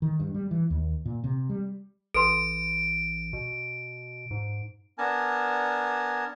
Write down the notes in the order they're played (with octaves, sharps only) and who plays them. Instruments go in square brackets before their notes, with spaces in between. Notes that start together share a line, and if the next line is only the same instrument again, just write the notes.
[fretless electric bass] D#3
G2
G3
E3
D#2
A#2
C3
G3
[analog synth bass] A1 [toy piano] A4 B4 C6 [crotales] D7
[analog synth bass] B2
G#2
[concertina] B3 D4 A#4 G#5 A5